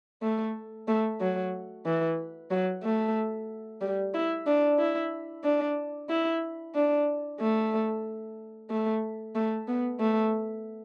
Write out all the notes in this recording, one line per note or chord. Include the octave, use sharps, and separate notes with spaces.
A3
A3
F#3
E3
F#3
A3
G3
E4
D4
E4
D4
E4
D4
A3
A3
A3
B3
A3